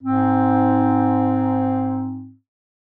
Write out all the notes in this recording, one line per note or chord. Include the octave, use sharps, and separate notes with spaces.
G#2 C4